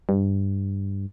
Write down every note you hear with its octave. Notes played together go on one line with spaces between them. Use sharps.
G2